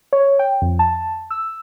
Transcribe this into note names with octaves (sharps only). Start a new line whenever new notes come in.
C#5
G5
F2
A5
E6